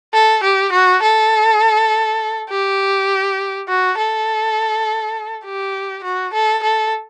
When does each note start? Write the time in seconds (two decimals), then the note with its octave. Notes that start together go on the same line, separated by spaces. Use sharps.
0.14 A4
0.44 G4
0.73 F#4
1.03 A4
2.50 G4
3.68 F#4
3.98 A4
5.45 G4
6.04 F#4
6.34 A4
6.63 A4